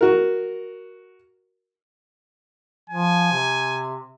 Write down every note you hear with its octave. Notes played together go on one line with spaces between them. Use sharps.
F#4 A#4
F3 G#5
C3